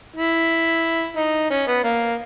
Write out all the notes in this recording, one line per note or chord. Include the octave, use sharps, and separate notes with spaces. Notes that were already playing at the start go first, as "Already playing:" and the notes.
E4
D#4
C#4
B3
A#3